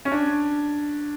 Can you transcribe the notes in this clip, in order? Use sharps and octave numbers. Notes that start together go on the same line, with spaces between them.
C#4
D4